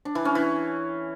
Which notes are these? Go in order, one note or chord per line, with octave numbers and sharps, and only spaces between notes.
D4
E3
C#4
E3